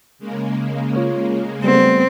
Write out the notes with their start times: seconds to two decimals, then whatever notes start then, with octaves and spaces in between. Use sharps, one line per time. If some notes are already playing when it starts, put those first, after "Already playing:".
0.19 C#3 G#3 A#3
0.96 F4 C#5
1.64 G3 A3 B3 C4